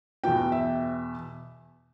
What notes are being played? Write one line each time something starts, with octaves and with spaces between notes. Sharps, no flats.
E2 B2 B3 G5
E5